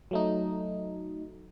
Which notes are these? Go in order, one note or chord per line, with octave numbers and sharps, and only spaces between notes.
F#3 A3 D#4